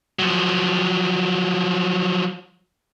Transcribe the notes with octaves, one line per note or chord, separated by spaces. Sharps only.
F3 F#3